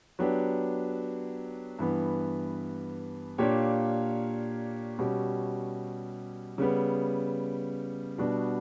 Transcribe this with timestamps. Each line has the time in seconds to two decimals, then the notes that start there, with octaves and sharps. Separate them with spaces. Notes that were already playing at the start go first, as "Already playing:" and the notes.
0.19 F#3 B3 D4 G4
1.79 G2 E3 B3
3.38 A#2 A#3 D4 G4 C#5
4.99 B2 G3 C#4 G4
6.58 C#3 G3 B3
8.18 B2 G3 B3 D4 F#4